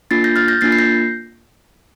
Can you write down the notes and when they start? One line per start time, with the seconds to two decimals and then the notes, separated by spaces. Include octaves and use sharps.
0.11 A#3 D4 F4 A6 C7
0.24 G6 A#6
0.36 F6 A6
0.48 G6 A#6
0.61 A#3 D4 F4 A6 C7
0.72 C7
0.79 G6 A#6